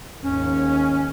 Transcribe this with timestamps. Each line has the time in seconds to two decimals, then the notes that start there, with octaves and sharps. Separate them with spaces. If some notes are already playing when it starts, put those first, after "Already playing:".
0.23 D#2 G#2 C#4